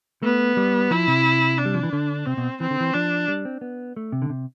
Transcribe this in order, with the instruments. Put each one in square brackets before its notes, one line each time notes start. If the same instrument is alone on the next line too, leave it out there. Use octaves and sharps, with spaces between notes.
[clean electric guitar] A3 [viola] B3
[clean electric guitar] G3
[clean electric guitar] F3 [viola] E4
[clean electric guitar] C3
[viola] D4
[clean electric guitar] G3
F3
E3
D3
[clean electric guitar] C3 [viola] C4
[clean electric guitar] B2
[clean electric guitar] E3 [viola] C4
[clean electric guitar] D3
E3
[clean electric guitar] F3 [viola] D4
[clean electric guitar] G3
C4
B3
A3
C3
D3
C3